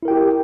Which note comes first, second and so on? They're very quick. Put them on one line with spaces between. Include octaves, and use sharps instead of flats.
E4 A#4 G5 G4